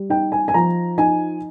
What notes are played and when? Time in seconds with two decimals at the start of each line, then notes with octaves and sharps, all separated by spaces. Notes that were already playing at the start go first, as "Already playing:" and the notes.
Already playing: G3
0.10 D#4 G5
0.32 G#5
0.48 G#5
0.54 F3 A#5
0.98 D#4 G#5